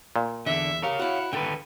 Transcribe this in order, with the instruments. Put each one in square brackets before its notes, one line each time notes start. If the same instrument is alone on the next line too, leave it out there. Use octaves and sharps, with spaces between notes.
[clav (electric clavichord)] A#2
[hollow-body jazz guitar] E2 [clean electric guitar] D3 [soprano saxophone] E5
[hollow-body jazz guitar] G4 A#4 [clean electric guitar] C#5 F5
[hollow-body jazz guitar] E4 F#4 [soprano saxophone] F#5
[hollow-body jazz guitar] D#2 G5 [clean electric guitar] D3 A4 B4